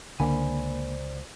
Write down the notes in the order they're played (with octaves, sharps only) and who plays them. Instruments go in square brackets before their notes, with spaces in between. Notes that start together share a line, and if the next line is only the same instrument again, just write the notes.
[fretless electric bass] C#2 [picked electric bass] D3 [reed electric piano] A#3 B5 [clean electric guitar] C5 D5 G#5